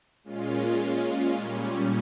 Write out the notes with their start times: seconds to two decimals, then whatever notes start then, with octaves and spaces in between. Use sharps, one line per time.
0.24 A#2 G#3 C#4 F4
1.41 A#2 G3 C#4